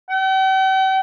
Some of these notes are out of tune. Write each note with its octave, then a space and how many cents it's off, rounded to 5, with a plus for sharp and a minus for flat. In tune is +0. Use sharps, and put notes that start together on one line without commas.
G5 -45